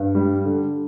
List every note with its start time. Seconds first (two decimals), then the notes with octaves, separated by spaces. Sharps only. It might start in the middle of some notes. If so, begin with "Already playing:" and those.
Already playing: G2
0.15 G3
0.45 D3